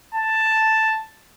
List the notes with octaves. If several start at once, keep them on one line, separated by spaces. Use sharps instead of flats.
A5